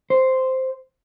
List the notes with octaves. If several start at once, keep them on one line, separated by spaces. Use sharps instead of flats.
C5